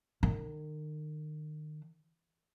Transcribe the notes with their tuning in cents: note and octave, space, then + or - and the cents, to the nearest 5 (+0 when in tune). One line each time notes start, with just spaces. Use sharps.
D#3 -35